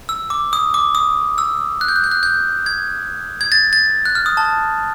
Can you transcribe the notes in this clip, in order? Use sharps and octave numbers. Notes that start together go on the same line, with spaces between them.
E6
D6
D#6
D6
D#6
E6
F#6
G6
F#6
G6
F#6
G6
G#6
G#6
A6
A6
F#6
F6
D#6
A5